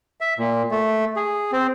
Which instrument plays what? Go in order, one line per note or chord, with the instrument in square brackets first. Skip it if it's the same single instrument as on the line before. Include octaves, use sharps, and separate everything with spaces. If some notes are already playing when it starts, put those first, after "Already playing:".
[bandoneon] E5
A#2
A3
G#4
C4